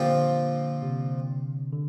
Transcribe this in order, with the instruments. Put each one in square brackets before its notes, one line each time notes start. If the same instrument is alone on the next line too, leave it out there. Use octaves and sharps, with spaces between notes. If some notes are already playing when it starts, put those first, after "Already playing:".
Already playing: [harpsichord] A#2 F3 C4 G4 [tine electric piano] D3
[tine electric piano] C3
D3